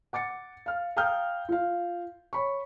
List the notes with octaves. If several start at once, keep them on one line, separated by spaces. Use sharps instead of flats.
F#5 D6 A6 C#7
F5 F6
F5 G5 A#5 D#6 F6 G6
F4 F5
C#5 B5 C#6